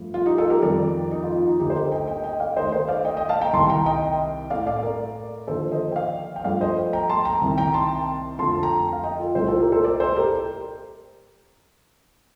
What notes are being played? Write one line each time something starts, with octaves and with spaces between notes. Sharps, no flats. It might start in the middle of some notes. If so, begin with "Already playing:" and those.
Already playing: G2 F3 A3
F4
D#4 G4
F4 A4
G4 A#4
F2 D#3 G3 A#4 D5
D#4
F4
F4
D#4
D2 D3 A3 D#4 G4
C5
G4 A#4
D#5 G5
D#5 G5
D#5 G5
D5 F5
D#2 D#3 A3 C5 D#5
C5 D#5
D5 F5
D#5 G5
D#5 G5
F5 A5
G5 A#5
C2 C3 D#3 G3 A5 C6
G5 A#5
D#5 G5
A2 A3 D5 F5
D5 F5
A#4 D5
D#2 D3 F3 A4 C5
C5 D#5
G5
D5 F5
G5
G2 F3 A3 D5 F5
C5 D#5
G5 A#5
A5 C6
G5 A#5
C2 C3 D#3
G5 A#5
A5 C6
F2 D3 F3 A3 A5 C6
A5
G5 A#5
F5
D#5 G5
F4 A4
C2 A#2 A3 A4 C5
F4 A4
G4 A#4
A4 C5
A#4 D5
A4 C5
G4 A#4